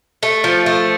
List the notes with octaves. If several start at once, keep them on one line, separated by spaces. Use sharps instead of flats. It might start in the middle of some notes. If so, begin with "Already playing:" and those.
A3
F3
A3